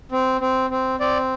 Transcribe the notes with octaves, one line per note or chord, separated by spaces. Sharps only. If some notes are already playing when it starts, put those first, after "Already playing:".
C4
C4
C4
C4 D5